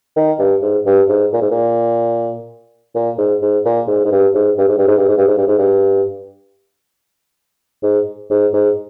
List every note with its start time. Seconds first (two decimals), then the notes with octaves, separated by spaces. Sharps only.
0.16 D#3
0.39 G2
0.62 G#2
0.86 G2
1.09 G#2
1.33 A#2
1.41 G#2
1.51 A#2
2.95 A#2
3.18 G#2
3.42 G#2
3.65 A#2
3.88 G#2
4.05 G#2
4.11 G2
4.34 G#2
4.58 G2
4.68 G#2
4.78 G2
4.88 G#2
4.97 G2
5.08 G#2
5.17 G2
5.28 G#2
5.37 G2
5.48 G#2
5.58 G2
7.83 G#2
8.30 G#2
8.53 G#2